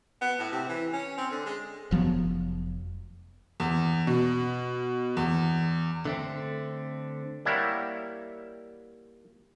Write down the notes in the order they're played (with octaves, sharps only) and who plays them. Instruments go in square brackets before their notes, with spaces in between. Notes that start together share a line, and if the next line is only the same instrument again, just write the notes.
[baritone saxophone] B3
A2
C3
E3
C#4
C4
D3
G#3
[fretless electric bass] F1 F3 F#3 B3
[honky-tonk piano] E2
B2
E2
[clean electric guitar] D3 A3 C4
[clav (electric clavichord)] G3 A#3 E4 C#5 F#5